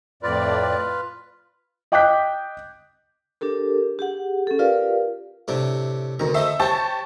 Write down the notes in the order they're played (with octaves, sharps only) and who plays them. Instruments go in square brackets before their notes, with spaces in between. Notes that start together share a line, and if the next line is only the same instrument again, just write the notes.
[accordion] F2 A2 D5 [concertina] F4 B4
[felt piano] D#5 G5 D6 F#6 G6 B6
[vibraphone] D4 G4 A4 A#4
G4 G#4 F#5
C#4 A4
F4 G4 A#4 B4 D5 F5
[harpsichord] A2 C3 D4
[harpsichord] D2 A#5 [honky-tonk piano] D#3
[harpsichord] A3 C5 D#5 [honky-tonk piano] E5
[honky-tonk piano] G4 A5 C#6 [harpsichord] C5 C#5